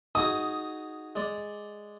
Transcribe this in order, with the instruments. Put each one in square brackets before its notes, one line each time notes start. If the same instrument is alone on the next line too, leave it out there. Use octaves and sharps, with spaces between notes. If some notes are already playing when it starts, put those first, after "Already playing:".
[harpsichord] D#4 F#4 G#4 [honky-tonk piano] D#6
[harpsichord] G#3 D5